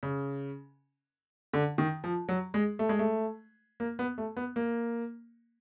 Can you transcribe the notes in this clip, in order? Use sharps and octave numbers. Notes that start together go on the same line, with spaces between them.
C#3
D3
D#3
F3
F#3
G#3
A3
G#3
A3
A#3
B3
A3
B3
A#3